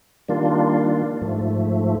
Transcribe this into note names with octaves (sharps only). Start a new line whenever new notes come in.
D#3 G3 A#3 D4 F4
G#2 F3 A3